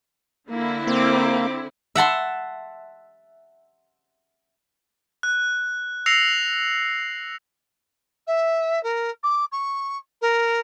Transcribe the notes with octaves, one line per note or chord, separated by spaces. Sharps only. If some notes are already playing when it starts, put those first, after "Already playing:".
D3 A#3 E4
A#3 C4 D6
E5 F#5 A5 C6
F#6
E6 A#6 C7 C#7 F7
E5
A#4
D6
C#6
A#4